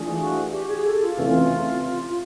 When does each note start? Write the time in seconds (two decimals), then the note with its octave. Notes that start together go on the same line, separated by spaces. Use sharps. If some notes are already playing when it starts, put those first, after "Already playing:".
Already playing: E3 A3 D4 F4 G#4
0.18 F#4
0.51 G4
0.67 G#4
0.84 A4
1.01 F4
1.17 C3 E3 A3 C#4